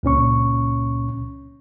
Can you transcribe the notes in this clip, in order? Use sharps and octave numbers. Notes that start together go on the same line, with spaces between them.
C#2 A#2 C#4 C#6